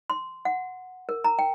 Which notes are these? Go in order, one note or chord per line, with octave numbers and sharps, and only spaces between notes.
C6
F#5
A#4
A#5
G5